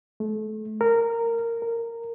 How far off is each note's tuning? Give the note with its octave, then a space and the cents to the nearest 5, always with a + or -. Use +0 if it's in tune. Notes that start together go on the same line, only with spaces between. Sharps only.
A3 -30
A#4 -15
A#4 -15